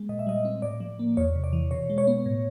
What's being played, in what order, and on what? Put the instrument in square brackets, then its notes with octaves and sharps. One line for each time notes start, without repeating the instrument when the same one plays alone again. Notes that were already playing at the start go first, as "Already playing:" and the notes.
Already playing: [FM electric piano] G#3
A#2 D#5
E5
G3 D#5
C4
A2 D5
F3
A#3
E2 C#5
C3
D5
E3
B2 C#5
G#3
C#5
B3
A2